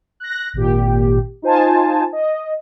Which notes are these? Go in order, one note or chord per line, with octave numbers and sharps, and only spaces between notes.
F#6 A#6
G#1 A#2 G4
D#4 F4 C5 G#5 A5
D#5